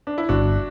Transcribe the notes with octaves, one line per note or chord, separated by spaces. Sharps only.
D4
E4
G1 D4 F#4